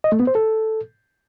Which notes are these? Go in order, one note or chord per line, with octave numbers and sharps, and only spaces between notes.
D#5
A3
B3
C5
A4